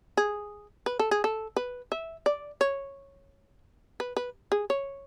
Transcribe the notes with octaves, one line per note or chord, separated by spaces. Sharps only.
G#4
B4
A4
G#4
A4
B4
E5
D5
C#5
B4
B4
G#4
C#5